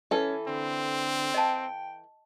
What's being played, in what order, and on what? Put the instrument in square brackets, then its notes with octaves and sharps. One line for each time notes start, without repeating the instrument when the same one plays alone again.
[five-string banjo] E3 A4 [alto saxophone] C#4
[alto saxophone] D3 [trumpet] C4
[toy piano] D#5 A5 [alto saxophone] G5